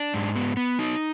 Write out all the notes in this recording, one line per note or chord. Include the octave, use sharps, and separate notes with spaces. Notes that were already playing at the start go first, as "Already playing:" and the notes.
Already playing: D4
G#2
B3
B3
D#4